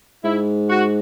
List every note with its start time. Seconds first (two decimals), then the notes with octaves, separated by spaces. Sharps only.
0.24 G#2 E4
0.70 F#4